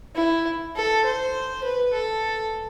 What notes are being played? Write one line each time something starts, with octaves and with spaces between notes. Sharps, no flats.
E4
A4
C5
B4
A4